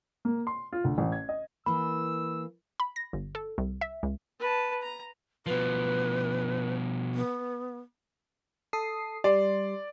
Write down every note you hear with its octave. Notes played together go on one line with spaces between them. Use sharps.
A#3
C6
F4
D2
A1
G#6
D#5
E3 A#3 B5 E6
B5
A#6
G1
A4
C2
E5
C#2
B4 A5
A#5
B2 F3 B4
B3
A4 D#6 C7
G3 D5 C6